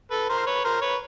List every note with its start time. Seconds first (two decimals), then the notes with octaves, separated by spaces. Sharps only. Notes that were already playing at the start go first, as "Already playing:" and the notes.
0.11 A4 B4
0.29 A#4 C5
0.47 B4 C#5
0.64 A#4 C5
0.81 B4 C#5